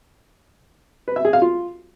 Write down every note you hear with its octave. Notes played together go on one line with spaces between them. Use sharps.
B4
E5
G#4
F5
F4